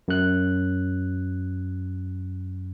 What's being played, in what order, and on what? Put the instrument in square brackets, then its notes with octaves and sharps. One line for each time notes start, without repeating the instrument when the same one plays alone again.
[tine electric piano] F#2 F#6